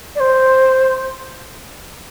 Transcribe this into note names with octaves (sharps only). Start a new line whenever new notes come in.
D5
C5